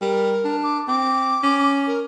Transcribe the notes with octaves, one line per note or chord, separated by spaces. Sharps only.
G3 A#4
D4
D6
C4 D6
C#4
A#4